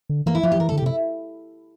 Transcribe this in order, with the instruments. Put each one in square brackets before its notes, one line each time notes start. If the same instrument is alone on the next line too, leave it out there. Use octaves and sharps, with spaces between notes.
[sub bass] D3
[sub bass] E3 [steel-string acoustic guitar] A#3
[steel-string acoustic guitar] E4
[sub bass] F3 [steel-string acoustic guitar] F4
[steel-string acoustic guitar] G4
[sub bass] F3
[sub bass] E3 [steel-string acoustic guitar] A#4
[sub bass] D3 [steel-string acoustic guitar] A4
[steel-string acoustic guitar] G4
[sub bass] C3
[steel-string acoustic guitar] E4